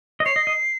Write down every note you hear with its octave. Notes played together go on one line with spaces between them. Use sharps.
D#5
C#5 C7
D#5
D#5